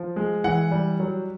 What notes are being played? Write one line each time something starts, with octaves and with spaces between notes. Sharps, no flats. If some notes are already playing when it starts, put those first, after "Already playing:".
Already playing: F3
G#3
E3 F#5
G3
F#3